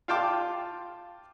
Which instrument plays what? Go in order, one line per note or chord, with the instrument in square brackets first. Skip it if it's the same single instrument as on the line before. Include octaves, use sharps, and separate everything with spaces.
[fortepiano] F4 F5 G5 A5 C6 D6